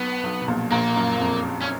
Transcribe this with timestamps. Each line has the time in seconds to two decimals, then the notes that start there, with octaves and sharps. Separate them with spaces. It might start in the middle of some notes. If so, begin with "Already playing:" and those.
Already playing: B1 B2 B3
0.23 B1 B2
0.42 B2
0.48 A#1 A#2
0.71 A#1 A#2 A#3
0.96 F#2
1.20 F2
1.61 C#4